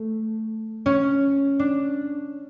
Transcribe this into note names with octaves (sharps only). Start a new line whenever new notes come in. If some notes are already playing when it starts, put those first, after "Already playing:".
Already playing: A3
C#4
D4